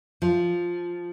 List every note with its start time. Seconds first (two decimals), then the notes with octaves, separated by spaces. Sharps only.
0.22 F3